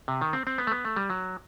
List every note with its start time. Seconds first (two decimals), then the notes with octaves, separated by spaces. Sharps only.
0.08 C3
0.21 D#3
0.33 C4
0.47 C4
0.58 B3
0.67 A3
0.72 B3
0.85 A3
0.96 G3
1.10 F#3